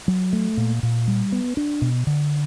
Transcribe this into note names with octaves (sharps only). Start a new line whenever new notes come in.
F#3
A3
A#2
A#2
G3
B3
D4
B2
D3